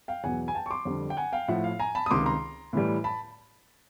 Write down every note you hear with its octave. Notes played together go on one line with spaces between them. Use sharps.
F5 G5
E2 B2 F#3 F#5 G#5
G#5
G5 A5
C#6
C6 D6
F2 D3 G3
G5
F#5 G#5
F5 G5
A2 F3 E5 F#5
F5
G#5 A#5
A5 B5
D#6
C#2 C3 D#3 C6 D6
A#5 C6
A2 E3 G3
A5 B5